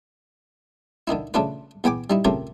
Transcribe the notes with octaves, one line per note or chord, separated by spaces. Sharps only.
D3 D#3 D#4 E4
C#3 A3 D4 F4 B4
E2 B3 G5 G#5 D6
G3 D#4 E4
C#3 F3 A3 C4 G4 A#4